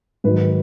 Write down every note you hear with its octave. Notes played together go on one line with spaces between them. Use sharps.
G#2 D#3 F#3 B4